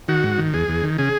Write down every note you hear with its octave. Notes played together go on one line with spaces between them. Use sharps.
D#3 F#4
G#2
D#3
E2 G#4
E2
D#3
C#3 G#4